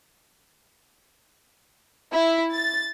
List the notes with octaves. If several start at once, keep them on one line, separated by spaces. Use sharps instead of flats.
E4
A6